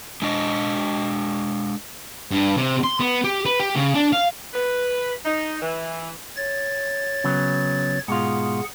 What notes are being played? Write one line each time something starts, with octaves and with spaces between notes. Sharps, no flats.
G#3 D4 D#5
G2
C3
C6
B3
G4
B4
G4
C#3
D4
F5
B4
D#4
E3
C#5 A6
C#3 F#3 B3
G#2 B2 F4 G#4 F#5